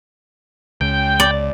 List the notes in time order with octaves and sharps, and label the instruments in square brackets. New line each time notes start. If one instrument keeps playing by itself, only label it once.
[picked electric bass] C#2 [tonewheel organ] G5
[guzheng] D5